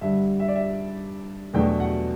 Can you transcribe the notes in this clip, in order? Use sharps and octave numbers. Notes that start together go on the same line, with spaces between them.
G2 D3 G3 E5
E5
D5
E5
E2 B2 F#3 A3 D4 G5
F#5